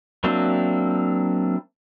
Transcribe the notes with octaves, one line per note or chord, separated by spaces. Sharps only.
F#3 A#3 C4 D4 E4